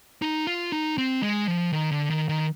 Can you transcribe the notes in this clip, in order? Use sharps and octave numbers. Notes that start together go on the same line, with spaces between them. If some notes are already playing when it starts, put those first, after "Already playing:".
D#4
F4
D#4
C4
G#3
F3
D#3
D3
D#3
D#3